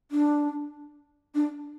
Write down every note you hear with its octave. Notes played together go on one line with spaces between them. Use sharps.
D4
D4